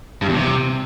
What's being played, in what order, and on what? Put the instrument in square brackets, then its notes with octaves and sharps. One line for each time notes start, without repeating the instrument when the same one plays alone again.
[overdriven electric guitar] G2
E2
C3